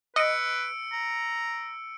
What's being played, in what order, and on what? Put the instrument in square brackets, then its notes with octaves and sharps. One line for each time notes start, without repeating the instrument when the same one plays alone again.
[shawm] B4 [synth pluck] D#5 [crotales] E6 C#7 D7
[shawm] A#5